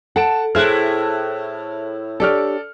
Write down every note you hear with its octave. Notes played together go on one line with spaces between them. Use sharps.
A4 F#5 A5 D7
A2 E4 G#4 C5 F6 F#6
D4 G4 A4 C#5 D5 F6